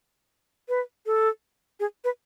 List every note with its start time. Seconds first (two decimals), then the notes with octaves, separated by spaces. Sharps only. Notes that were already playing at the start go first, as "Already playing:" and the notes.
0.69 B4
1.06 A4
1.80 G#4
2.04 B4